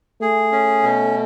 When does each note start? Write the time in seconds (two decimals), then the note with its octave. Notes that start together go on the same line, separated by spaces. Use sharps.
0.21 A3 G#4
0.52 C#4
0.83 B2